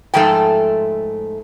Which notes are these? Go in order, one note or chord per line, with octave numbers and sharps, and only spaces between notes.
G#2 F3 A3 G5